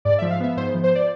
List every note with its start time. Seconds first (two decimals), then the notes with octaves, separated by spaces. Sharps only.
0.05 G#2 D5
0.18 F3 E5
0.30 F5
0.40 B3 E5
0.57 G#2 C5
0.74 F3
0.83 C5
0.95 D5